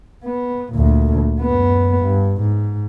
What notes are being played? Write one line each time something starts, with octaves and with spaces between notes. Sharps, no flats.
B3
D2 A#2
F#2 B3
G2
G#2